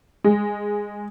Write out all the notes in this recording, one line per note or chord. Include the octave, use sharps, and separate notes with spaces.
G#3